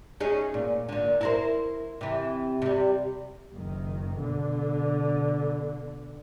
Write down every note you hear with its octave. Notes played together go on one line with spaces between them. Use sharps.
C#4 D#4 G#4
A#2
A#2 D3
E4 A#4 C5
C3 E3
C3 G3
F#1 D#3
B2 D3